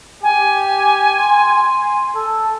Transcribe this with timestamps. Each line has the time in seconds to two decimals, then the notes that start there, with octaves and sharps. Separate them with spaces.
0.23 G4 G#5
1.19 C6
2.15 A4